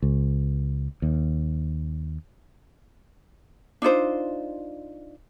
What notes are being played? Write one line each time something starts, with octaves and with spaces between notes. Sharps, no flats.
C#2
D#2
D4 D#4 F4 C5